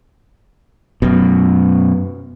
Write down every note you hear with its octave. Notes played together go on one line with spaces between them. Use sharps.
F#2 B2